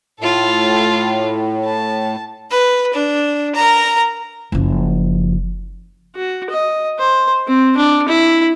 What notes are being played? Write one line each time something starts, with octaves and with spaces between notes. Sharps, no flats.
A2 F4 A4
A5
B4
D4
A#4 A#5
F#1 F3
F#4
D#5
C5
C4
D4
E4